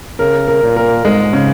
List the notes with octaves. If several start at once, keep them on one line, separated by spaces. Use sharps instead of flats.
C#3 A#4
A#4
A#2
A#4
G#2 G#3
C#3